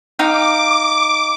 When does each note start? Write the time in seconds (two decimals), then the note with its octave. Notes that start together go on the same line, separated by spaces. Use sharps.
0.19 D#4 F5 G5 D6